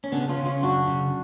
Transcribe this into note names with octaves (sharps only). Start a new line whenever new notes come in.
C#4
C#3 B3 D4
C#4 F4
C#3
C#4 F4
F#2 D4 F#4
C#3